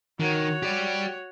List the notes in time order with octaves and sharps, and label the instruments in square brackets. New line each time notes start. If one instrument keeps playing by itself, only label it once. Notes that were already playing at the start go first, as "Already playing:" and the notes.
[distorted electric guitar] D#3 [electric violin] F#4 C#5
[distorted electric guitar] G4 D5